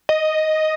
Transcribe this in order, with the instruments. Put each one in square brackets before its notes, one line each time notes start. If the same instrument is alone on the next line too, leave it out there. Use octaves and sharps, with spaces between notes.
[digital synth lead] D#5